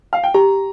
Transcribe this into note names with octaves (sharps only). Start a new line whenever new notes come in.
F5
G5
G4 A#5